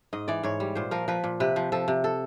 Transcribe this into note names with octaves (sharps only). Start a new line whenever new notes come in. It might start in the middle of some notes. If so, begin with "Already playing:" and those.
G#2 D#5
E3 D5
G#2 C#5
G3
A#2 C5
F3 A#4
F3 B4
A#2
C3 B4
F3
F3 A4
C3
A4